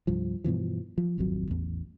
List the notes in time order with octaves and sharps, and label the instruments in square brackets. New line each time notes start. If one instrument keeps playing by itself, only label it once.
[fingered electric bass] C2 G2 F3
G2 B2 E3 F3
F3
D#1 G#1 F2 F#3
A1 E2